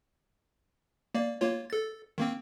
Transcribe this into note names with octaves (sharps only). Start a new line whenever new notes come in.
A#3 D5
A#3 F4 C#5
A4 A6
D#3 A#3 C4